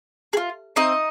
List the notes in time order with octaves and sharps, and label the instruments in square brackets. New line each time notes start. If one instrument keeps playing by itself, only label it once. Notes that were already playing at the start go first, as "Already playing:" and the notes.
[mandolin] G#4
F4
C4 D#4 D#5